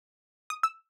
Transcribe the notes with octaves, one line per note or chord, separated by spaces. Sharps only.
D#6
E6